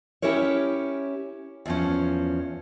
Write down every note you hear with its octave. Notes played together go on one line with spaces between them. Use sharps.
C#4 E4 G4 A#4 C#5
E2 F3 C#4